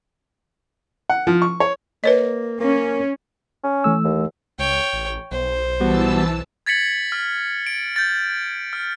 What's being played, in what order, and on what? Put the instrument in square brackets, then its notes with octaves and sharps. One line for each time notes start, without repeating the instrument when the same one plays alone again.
[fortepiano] F#5
F3
C#6
C#5
[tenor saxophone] A#3 [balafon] B4 C#5 D#5
[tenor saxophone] A#3 [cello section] C#4
[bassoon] C#4
[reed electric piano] E3 A3 E6
[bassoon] D#2
[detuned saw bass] C#2 [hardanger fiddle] C#5 G5
[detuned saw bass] A1
[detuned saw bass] B1 [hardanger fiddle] C5
[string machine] E3 A5 E6 [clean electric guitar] G3 B3 F#4
[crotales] G#6 A6 B6 C#7 F#7
F6
D7
G6 A6
F6